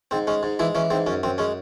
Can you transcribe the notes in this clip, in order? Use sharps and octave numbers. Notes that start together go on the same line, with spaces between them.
G#2 C4
G#3 C#4
G#2
E3 G#3 E4
E3 C#4
G#2 C4
F#2 C#4
F#2 C4
G#3 C#4